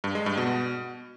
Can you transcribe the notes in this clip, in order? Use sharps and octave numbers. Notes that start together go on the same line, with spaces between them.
G2
G#3
G2
B2